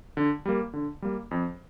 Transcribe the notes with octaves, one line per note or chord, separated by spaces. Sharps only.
D3
G3 A#3
D3
G3 A#3
F2